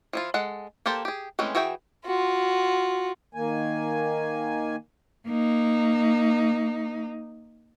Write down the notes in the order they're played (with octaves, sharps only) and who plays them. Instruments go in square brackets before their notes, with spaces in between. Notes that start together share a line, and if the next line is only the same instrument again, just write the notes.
[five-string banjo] F3 E4 F4
G#3 A4 F#5
A#3 G4 A4 C5 A5
G4 G#4
E3 G#3 A3 C4 C#4
E3 F#4 G#4 E5 G5
[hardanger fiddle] F4 F#4
[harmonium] D#3 A#3 G#5
[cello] A#3 D#4